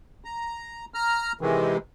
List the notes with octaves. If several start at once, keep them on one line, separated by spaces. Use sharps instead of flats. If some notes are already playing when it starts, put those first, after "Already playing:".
A#5
A#5 F6
C3 D#3 E3 G#3